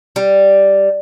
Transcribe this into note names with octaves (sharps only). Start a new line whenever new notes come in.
G3